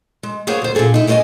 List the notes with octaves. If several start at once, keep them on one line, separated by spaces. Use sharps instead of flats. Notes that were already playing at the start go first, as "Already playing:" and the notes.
G#3
A#3 B3 G#4 C5 C#5 G#5
D2 C5
A#2 D3 D4 G#4 A4
D#4 E4
G3 B3 F#4 C5 D#5 G#5